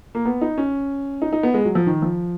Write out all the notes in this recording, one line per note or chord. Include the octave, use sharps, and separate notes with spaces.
A#3
B3
D#4
C#4
D#4
D#4
B3
G#3
F#3
F3
D#3
F3